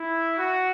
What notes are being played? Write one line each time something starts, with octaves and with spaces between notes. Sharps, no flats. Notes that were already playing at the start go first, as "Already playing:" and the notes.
Already playing: E4
F#4